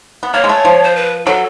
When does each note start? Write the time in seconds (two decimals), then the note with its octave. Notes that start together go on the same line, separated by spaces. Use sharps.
0.23 B3
0.34 A#3 C#5
0.44 G#3
0.49 A3
0.65 F3
0.84 C5
0.96 B4
1.27 F#3 A4